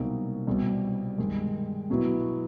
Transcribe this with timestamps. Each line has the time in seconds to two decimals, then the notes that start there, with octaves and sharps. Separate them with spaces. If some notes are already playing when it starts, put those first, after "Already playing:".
Already playing: C2 B2 F#3 A#3 D#4
0.47 C2 B2 G3
1.18 G2 D#3 G#3
1.90 B2 F#3 B3 E4